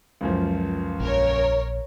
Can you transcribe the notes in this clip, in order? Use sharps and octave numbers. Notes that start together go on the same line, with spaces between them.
C#2 F#2 F3
A#1 A#4 C#5